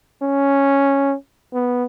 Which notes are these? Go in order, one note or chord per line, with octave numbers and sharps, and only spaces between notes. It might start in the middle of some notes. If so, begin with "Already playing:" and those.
C#4
B3